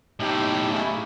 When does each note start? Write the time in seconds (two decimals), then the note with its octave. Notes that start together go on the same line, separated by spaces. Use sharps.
0.20 B1 A2 D#4 G4
0.71 C#3 E4